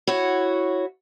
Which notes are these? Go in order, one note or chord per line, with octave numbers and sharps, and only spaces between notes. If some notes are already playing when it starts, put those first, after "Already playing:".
E4 F#4 C#5